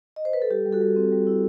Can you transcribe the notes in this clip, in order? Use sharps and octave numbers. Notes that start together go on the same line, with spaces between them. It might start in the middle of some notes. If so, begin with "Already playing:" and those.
D#5
C5
B4
A4
G3 G4
G3
F#4 A4
G3
C4
G3
E4